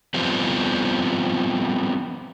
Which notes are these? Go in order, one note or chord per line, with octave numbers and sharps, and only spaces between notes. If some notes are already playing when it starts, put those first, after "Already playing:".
F3 G3 B3 C4